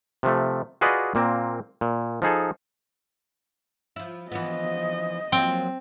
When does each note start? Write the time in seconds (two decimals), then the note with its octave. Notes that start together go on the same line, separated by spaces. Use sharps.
0.23 C3 F3 A3
0.81 F4 F#4 G#4 B4 D5 D#5
1.15 A#2 A#3 C4
1.81 A#2
2.22 F3 D#4 G#4 A4
3.96 F3 E4
4.32 E3 F3 B3 D#5
5.32 F3 F#3 A#3 C4 G5